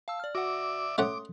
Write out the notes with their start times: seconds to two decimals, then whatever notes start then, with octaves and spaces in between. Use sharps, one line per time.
0.08 F5 A5 E6
0.20 D5 F6
0.35 F#4 D5 E5 F#5 D6
0.98 A3 C#4 F#5 C6 D6 D#6